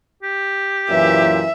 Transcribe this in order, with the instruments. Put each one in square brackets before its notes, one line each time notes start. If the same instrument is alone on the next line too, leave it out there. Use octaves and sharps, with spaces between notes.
[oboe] G4
[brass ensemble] F#2 A#2 E3 [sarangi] E5